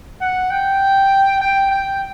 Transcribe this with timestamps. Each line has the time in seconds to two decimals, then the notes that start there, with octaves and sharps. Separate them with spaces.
0.21 F#5
0.51 G5
1.41 G5
1.71 G5